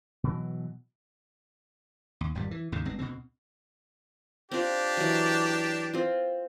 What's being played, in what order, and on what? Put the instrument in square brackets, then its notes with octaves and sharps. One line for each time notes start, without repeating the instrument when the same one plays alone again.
[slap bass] B2 E3 F#3
D#2
G#1 F2 G3
E3
D#2 G#2 C#3
G1 G#3 C4
D2 B2 F3 C4
[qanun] C4 F4 [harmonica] D4 G4
[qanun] E3 F#3
C4 F4